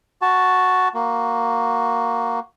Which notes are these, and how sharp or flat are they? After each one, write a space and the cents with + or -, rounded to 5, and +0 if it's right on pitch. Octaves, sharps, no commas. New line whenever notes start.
F#4 +0 A5 +0
A#3 +0 F#4 +0